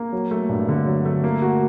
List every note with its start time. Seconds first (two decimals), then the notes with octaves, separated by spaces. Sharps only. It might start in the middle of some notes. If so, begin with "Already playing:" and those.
Already playing: A#3
0.13 F#3
0.31 A3
0.49 G2
0.69 D3
0.86 F#3
1.05 A3
1.24 A#3
1.42 F#4